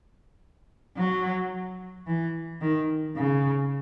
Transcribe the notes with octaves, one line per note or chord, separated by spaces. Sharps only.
F#3
E3
D#3
C#3